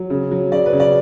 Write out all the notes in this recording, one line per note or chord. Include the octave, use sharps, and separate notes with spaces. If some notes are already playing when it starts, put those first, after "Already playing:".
Already playing: F#3
C#3
F#3
C#3 D5
B4
C#3
D5